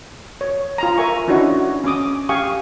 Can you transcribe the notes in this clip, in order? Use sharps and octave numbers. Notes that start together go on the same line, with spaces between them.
C#5
F4 A#5
A#4 E5 G#5 C#6
C#4 D4 E4 F#4 C#5 D#5
C#4 C#5 D6 D#6
G4 F5 G#5 C#6 D#6